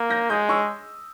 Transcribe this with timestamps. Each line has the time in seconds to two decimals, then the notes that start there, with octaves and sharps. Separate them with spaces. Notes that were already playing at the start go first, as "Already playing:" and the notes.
Already playing: A#3
0.10 G6 A#6
0.30 G#3 D#6 G6
0.49 C#6 E6